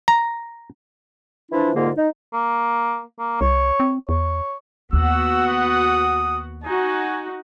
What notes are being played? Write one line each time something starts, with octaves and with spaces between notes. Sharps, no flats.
A#5
E3 F3 D4 E4 F4
C2 G#2 D3 A#3 F4 G#4
D#4
A#3
A#3
C2 C#5
C4
E2 C#5
D#2 B3 F#4 F#5 E6
D#6
D#4 F#4 G#5